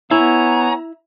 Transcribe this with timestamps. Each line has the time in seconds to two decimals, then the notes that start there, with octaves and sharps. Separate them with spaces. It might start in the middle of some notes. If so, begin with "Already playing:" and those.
0.11 B3 E4 C#5 G#5 A#5